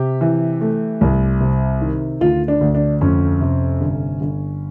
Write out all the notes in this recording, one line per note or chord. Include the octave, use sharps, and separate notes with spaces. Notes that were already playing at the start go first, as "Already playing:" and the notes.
Already playing: C3 G4
E3
A3
C2
C3
D#3
D2 F4
D4
D2
D4
F2 C#4
C3
G1
G1